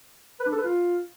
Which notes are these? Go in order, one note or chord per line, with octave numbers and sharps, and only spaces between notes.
B4
D4
A4
B4
F4